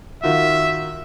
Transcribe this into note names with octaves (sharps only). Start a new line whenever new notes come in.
D#3 F4 F#4 E5